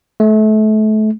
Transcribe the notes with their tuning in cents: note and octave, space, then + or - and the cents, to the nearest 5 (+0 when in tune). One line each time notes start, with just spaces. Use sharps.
A3 -30